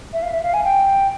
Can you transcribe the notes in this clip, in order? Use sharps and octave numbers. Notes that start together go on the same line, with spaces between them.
E5
F5
E5
F5
G#5
G5